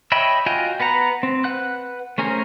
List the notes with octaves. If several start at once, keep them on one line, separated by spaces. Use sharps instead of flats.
C#5 D#5 E5 G5 B5
F4 F#4 D#5 G5 G#5
B3 B4 F#5 A#5
C4
B4 F#5 F#6
A3 C#4 G#4 A#4 C5